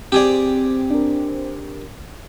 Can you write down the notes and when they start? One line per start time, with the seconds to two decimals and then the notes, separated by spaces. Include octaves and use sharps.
0.12 C4 G4 G#4 D5
0.90 D4 A#4